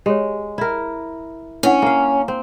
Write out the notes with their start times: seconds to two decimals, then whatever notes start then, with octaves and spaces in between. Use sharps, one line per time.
0.06 G#3 G4 C#5
0.58 E4 A#4
1.63 C#4 D4 E4 F#5
1.82 A#3 F5
2.28 C4